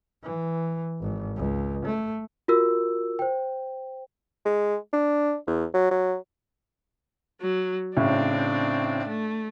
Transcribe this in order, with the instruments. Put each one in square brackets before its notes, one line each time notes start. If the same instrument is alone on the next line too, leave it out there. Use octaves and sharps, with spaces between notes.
[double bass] E3
G#1
C#2
A3
[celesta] F4 F#4 A#4 E6
C5 G5
[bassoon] G#3
D4
E2
F#3
F#3
[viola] F#3
[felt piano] A2 C#3 [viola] C4 D4
[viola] A3